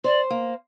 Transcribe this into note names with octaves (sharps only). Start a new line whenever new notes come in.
C5 D5
A#3